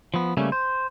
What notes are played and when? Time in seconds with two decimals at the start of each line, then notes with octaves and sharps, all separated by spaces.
0.14 F3 B3
0.37 C#3 G3 A3 A#3 C#4
0.52 C5